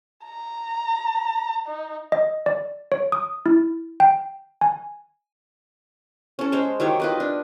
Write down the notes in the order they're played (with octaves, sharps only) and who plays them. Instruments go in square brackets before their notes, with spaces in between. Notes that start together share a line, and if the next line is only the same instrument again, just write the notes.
[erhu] A#5
D#4
[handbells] D#5
D5
C#5
D#6
E4
G5
G#5
[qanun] C#4 A4
G#3 C5 C#5
D#3 F#3 G4 C#5
F4 B4 D#5
D4